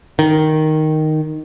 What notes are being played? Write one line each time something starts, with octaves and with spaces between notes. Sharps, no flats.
D#3